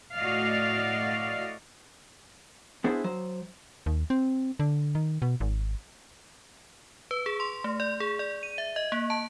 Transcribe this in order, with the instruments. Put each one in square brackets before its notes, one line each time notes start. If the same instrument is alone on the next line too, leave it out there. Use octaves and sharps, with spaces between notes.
[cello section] A2 A3 F#4 D5 D#5 F5
[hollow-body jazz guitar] B3 D4 E4 G#4 C5
F#3 C5
[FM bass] D#2
C4
D3
D#3
B2
G#1
[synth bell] B4
G#4
C6
A3
D5
G#4
D5
D#7
E5
D#5
A#3
A5